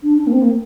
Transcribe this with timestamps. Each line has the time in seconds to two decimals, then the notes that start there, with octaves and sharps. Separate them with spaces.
0.03 D4
0.18 D4
0.27 A#3
0.32 C4
0.42 A#3